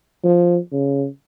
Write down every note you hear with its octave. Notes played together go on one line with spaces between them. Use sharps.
F3
C#3